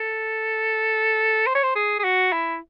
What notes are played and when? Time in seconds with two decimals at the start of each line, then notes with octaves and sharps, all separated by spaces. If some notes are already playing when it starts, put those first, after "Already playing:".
Already playing: A4
1.46 C5
1.55 C#5
1.63 C5
1.75 G#4
1.99 G#4
2.04 F#4
2.32 E4